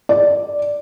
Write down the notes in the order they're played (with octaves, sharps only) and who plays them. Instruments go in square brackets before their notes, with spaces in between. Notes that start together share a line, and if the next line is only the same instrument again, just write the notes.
[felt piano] D5